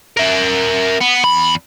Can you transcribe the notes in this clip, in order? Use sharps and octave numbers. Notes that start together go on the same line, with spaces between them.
A#4 E5
B3
E2 B5